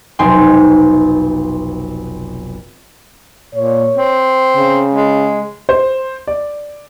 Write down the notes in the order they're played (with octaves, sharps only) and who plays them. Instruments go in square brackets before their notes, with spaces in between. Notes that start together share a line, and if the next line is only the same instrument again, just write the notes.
[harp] F1 B1 C4 D#4 G#5 C6
[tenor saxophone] A#2 [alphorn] C#5
[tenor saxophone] C4
[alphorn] C#3
[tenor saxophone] G#3
[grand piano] C5
D5